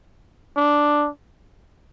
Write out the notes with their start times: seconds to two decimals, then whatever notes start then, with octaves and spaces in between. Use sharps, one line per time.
0.57 D4